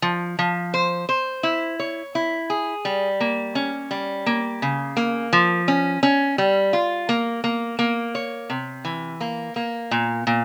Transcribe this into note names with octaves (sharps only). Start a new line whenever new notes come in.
F3
F3
C5
C5
E4
C#5
E4
G#4
G3
A#3
C#4
G3
A#3
C#3
A#3
F3
C#4
C#4
G3
F4
A#3
A#3
A#3
C#5
C3
E3
A#3
A#3
A#2
A#2